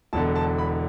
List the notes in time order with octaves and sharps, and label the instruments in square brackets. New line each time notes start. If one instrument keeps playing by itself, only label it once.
[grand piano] E1 E2 D3 A5
A5
B5